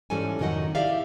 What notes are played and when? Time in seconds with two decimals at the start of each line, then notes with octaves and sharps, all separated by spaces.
0.10 G#2 E3 G3 C#4 A4 G#5
0.39 F2 C3 D#3 F#3 D#5 F#5
0.75 E4 G4 D5 E5 F5